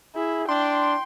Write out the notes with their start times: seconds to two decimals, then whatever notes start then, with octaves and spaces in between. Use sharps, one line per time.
0.16 E4 G#4
0.49 D4 G5 C6